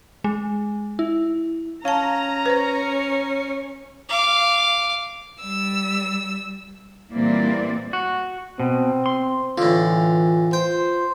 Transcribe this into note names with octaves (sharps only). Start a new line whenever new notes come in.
G#3
E4
C#4 F5 A5 A#5
B4 C5
F5 D6
G3 E6
A#2 E3 G3 A#3 C4 D5
F#4
B2 C4
C6
A2 D3 E3 F4
C5 G5